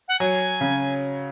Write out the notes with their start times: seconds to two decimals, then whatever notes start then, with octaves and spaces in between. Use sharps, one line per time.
0.08 F#5
0.20 F#3 G#5
0.61 C#3